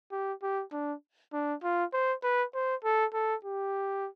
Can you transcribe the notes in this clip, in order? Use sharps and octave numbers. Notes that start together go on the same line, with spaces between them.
G4
G4
D4
D4
F4
C5
B4
C5
A4
A4
G4